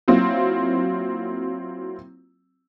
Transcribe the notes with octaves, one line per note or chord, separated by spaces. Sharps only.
F#3 A#3 C4 E4 F4